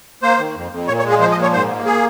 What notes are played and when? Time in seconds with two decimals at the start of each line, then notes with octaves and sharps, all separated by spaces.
0.22 A#3 C5
0.38 D#3
0.55 F2
0.72 F2
0.88 A#2 C#5
0.99 C#5
1.04 G#3
1.10 G#4
1.20 F3 C5
1.32 D#5
1.36 A#2
1.42 C#5
1.53 G#2 C5
1.69 A#3
1.86 G#4